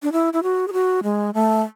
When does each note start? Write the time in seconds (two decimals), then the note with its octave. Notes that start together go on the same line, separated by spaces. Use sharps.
0.03 D4
0.12 E4
0.33 E4
0.43 F#4
0.68 G#4
0.73 F#4
1.03 G#3
1.34 A3